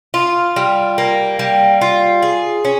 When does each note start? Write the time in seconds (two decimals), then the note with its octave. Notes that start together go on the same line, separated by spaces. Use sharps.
0.14 F4
0.56 G3
0.98 A#3
1.39 G3
1.81 F4
2.22 G#4
2.65 C#4